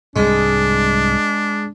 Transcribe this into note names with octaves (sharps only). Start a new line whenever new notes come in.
C2 G#2 G#3 D4